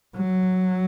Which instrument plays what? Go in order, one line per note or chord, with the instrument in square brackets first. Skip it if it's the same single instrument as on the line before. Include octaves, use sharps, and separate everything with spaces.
[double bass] F#3